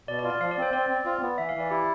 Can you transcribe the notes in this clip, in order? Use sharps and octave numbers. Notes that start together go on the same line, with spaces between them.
B2 D5
D5
F4
D5
F3 F5
D5
C4 C5
C4 D5
C4
F4
B3
E3 E5
F5
E3
D5
E4 G4